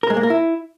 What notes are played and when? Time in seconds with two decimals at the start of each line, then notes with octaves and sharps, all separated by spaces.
0.03 A#4
0.10 G#3
0.17 A#3
0.23 A#4
0.30 E4